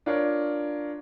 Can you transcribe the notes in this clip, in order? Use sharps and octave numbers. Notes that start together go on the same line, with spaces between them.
D4 F4 A#4 C#5